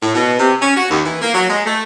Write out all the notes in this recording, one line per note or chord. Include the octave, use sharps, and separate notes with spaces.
A2
B2
C3
C#4
F#4
D#2
E3
A#3
F#3
G#3
A3